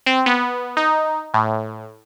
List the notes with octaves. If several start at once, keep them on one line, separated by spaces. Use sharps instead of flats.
C4
B3
D#4
A2